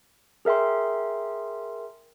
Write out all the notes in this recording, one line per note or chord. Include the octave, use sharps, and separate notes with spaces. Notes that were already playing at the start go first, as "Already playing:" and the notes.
G#4 A#4 E5 G5 C6